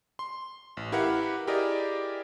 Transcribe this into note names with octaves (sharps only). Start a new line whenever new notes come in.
C6
A1
E4 G4 A#4 B4 F5 F#5
E4 G4 G#4 A#4 D5 D#5